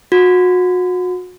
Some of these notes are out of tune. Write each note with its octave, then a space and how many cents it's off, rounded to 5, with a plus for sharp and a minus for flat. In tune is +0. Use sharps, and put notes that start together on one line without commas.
F#4 -30